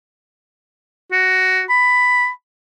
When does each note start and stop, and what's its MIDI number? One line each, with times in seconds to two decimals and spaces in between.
1.12 1.63 66
1.70 2.29 83